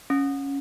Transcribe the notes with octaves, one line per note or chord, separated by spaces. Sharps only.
C#4